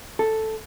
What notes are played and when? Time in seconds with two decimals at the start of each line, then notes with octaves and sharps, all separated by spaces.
0.19 A4